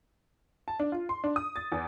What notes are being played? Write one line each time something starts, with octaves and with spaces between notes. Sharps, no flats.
A5
D4
F4
C6
D4
D#6
A6
E2